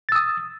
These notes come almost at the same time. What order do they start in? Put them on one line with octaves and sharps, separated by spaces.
A6 E6 D#6